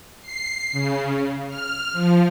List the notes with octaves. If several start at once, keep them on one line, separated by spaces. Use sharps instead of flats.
C7
C#3
F6
F3